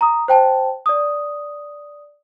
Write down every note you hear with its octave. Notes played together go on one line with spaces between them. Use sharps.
A#5 D#6
C5 G5 A5
D5 D#6